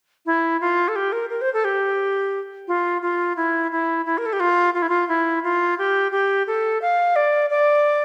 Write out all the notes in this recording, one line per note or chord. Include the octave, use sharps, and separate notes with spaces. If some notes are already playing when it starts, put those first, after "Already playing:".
E4
F4
A4
G4
A#4
A#4
C5
A4
G4
F4
F4
E4
E4
E4
A#4
A4
G4
F4
F4
E4
F4
E4
F4
G4
G4
A4
F5
D5
D5